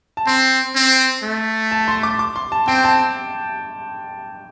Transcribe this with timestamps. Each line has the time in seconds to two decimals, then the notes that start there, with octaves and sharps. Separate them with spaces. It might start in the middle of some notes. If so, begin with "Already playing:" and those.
0.17 A5
0.26 C4 C6
0.75 C4
1.23 A3
1.72 A5
1.88 C6
2.03 D6
2.19 D6
2.36 C6
2.52 A5
2.67 C4 G5
2.84 A5